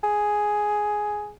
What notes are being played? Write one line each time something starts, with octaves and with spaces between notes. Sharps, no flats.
G#4